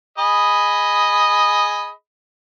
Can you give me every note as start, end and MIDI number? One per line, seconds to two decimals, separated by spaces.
0.18 1.91 68
0.18 1.91 75
0.18 1.91 83